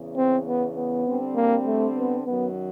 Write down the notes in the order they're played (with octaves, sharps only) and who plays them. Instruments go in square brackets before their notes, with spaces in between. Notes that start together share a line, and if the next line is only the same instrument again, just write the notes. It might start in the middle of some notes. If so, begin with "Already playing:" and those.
Already playing: [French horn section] E2 C#3 E3
[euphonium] C4
B3
B3
[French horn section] D3 G3 C4
[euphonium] A#3
A3
B3
[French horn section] F#2 D#3 F#3 [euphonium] B3